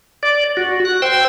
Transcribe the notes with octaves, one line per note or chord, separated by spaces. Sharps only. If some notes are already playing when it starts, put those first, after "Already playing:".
D5
F#4
F#6
C5 G5 E6